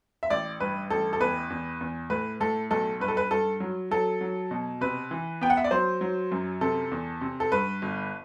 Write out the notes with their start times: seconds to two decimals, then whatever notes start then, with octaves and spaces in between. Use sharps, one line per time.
0.23 E5
0.30 A1 D5
0.60 G2 B4
0.90 A1 A4
1.13 A4
1.20 E2 B4
1.50 E2
1.81 E2
2.10 A2 B4
2.40 A2 A4
2.71 B1 A4
3.00 G2 B4
3.08 A4
3.17 B4
3.31 G2 A4
3.60 F#3
3.91 F#3 A4
4.21 F#3
4.51 B2
4.81 C3 B4
5.11 E3
5.41 B3 G5
5.50 F#5
5.57 E5
5.64 D5
5.71 F#3 C5
6.01 F#3
6.32 F#2
6.61 C3 A4
6.91 E2
7.21 C3
7.40 A4
7.52 G2 B4
7.82 G1